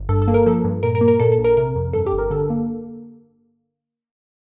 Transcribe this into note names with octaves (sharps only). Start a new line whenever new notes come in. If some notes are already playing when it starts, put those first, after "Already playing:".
Already playing: G1
G2 A4
A4
A#3
A#4
F3 A4
G2
A#2 A#4
A#4
A#3
A#4
A#2 A4
A4
A#1
A#4
C3 A#4
F2
G2 A4
G4
G1
A#4
D3 A4
A#3